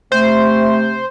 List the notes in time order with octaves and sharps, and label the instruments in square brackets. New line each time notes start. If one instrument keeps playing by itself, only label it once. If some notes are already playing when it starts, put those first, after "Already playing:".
[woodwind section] C3 A3 [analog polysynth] C5